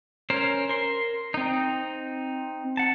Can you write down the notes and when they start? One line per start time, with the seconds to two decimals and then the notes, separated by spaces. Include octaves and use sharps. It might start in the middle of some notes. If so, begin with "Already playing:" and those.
0.30 C#4 A#4 C5
0.69 A#4 C6
1.34 C4 D#4
2.77 F#5 A5